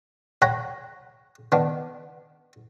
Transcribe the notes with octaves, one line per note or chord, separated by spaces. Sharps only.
C#5 F#5 G5 A#5 B5
D#3 B3 D4